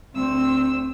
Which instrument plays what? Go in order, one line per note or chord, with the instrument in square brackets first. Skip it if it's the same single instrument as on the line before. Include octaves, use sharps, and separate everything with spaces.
[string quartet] D2 E6 [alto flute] C4